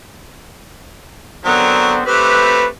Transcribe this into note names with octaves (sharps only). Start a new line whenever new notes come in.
D3 F#3 B3 C4 A#4
A3 C4 G4 B4